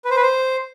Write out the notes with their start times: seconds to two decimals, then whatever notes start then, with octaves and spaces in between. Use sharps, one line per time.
0.05 B4
0.11 C5
0.17 B4
0.22 C5